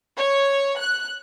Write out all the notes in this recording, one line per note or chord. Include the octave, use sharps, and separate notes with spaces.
C#5
F#6